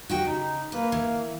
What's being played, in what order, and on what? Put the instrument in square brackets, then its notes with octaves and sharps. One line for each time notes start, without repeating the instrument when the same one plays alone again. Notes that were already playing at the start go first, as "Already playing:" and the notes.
[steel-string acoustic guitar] F#4 D#5 G5
[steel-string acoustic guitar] C#3 [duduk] D#4
[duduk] A#3 [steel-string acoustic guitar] B4
[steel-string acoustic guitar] E3